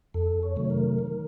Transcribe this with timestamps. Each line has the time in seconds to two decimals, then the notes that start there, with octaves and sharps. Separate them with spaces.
0.14 F2 A4
0.43 C#5
0.56 C3 D#3 F#3 A3
0.70 A#4
0.99 D#3